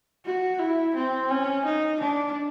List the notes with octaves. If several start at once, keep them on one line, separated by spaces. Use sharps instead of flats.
F#4
E4
C4
C#4
D#4
D4